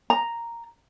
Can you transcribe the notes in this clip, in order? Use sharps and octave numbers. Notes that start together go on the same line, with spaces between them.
A#5